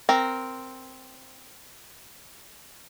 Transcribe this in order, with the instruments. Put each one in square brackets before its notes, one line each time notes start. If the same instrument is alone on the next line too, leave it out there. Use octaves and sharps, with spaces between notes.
[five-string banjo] C4 A#4